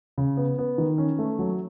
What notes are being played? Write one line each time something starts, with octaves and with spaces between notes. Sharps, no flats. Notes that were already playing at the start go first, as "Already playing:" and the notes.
C#3
B3
B3
D#3
C#4
A3
F#3